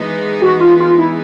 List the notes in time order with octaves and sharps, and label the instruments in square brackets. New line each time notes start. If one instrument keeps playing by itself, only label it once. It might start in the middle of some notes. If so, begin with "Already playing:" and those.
Already playing: [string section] E3 G#3 B3 D#4
[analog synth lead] F#4
F4
F4
E4